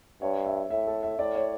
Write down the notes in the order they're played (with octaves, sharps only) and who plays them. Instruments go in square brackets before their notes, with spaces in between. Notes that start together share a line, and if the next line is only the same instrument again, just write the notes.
[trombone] G2 [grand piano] C#5
[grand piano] E5
[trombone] A2 [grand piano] E5
[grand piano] A4
E5
[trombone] A2 [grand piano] D5
[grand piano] C#5